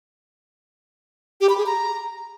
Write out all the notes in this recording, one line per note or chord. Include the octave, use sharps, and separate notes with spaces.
G4
B5
G#4
A#5